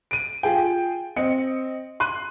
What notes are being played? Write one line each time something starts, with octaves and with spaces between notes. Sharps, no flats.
D7 D#7
F4 G#4 G5
C4 D#5 C#7
C6 F#6 D#7